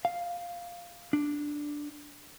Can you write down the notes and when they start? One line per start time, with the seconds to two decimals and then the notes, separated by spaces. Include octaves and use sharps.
0.05 F5
1.13 D4